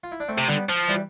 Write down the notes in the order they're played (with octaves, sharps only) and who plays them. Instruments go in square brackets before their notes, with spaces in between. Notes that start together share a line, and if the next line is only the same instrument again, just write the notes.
[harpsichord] F4
E4
D4
A3 C4
[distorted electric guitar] C3
[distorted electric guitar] D3 [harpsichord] G3 B3
[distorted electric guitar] F3
[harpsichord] E3 G3